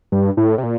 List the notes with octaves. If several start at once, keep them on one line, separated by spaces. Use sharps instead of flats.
G2
A2
C3
A#2